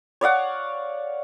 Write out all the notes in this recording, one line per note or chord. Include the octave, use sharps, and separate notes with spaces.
C#5 D5 F5 F#5